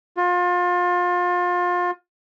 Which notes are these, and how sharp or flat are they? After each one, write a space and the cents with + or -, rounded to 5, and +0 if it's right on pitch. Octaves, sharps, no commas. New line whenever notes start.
F4 +30